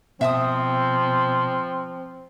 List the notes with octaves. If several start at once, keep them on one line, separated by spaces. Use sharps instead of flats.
B2 F3 C4 E5 A5 D#6